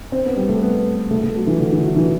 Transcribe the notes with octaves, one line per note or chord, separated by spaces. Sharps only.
C4
B3
G3
A3
B3
A3
A3
F#3
E3
D3
E3
F#3
E3